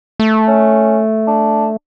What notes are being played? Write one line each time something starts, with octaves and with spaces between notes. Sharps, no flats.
A3
C#4
D4